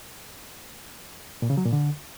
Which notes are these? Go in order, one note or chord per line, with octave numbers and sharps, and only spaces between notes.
A#2
C#3
F#3
A#2
D3